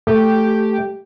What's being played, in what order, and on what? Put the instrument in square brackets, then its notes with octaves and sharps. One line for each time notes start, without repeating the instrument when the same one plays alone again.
[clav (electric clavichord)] A3 [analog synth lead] G4